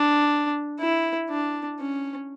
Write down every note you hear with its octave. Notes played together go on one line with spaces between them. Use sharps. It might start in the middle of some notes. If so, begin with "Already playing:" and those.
Already playing: D4
E4
D4
C#4